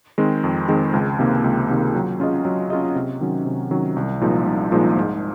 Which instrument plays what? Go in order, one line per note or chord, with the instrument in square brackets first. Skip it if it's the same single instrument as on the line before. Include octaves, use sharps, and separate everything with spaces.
[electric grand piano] D#3 G#3 C4
F2
D#3 G#3 C4
C#2
C3 D#3 A#3
C#2
C3 D#3 A#3
F#3
C#4 F4 G#4 D#5
F#3
C#4 F4 G#4 D#5
C3
D#3 F#3 C#4
C3
D#3 F#3 C#4
C2
A#2 F3 G#3 D#4
C2
A#2 F3 G#3 D#4
G#2